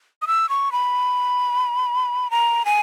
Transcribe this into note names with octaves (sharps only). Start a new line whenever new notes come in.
D#6
E6
C#6
B5
A#5
G#5